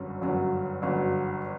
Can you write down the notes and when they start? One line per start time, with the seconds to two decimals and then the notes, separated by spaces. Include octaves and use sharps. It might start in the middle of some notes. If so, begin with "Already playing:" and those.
Already playing: G1 F#2 F#3
0.21 G1 F#2 F#3
0.82 G1 F#2 F#3